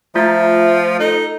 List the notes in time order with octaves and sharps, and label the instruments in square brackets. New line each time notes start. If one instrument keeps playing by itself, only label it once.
[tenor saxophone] F3 [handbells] A3 F4 A6 [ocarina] E5
[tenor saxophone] D#4 [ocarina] A4